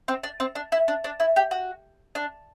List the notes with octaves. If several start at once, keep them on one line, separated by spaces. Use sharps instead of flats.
C4
D4
C4
D4
E4
D4
D4
E4
G4
F#4
D4